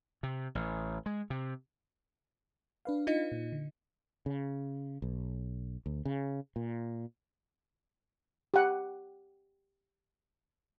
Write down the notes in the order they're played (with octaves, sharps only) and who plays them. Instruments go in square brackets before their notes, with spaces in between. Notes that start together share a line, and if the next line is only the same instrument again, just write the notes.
[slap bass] C3
A1
G#3
C3
[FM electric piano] D4 B4 F5
[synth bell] D#4 F4 D#5
[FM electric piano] A#2
D3
[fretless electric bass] C#3
B1
D2
C#3
A#2
[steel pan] G4 F#5